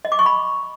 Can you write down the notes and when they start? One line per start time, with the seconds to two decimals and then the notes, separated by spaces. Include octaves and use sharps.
0.05 D#5
0.12 D6
0.19 C#6
0.26 B5